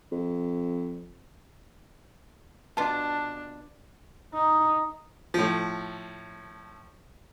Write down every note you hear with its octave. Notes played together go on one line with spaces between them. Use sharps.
F2
B2 D4 F4 A5
D#4
A2 F3